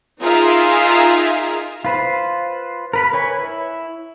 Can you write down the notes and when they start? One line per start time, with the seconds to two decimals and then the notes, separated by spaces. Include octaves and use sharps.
0.21 D#4 F4 G#4 A#4 E5 F5
1.85 F4 B4 C5
2.93 A#4 B4 B5
3.13 B4 C#5 G#5
3.39 E4